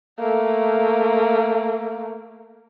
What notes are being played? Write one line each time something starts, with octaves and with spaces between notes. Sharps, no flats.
A3 A#3